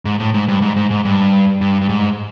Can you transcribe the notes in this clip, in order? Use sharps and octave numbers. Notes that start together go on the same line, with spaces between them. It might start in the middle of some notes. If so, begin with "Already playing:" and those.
G#2
A2
G#2
G2
G#2
G#2
G#2
G2
G2
G2
G#2